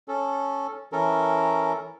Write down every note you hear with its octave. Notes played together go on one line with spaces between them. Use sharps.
C#4 A4
E3 C#4 A4 A#4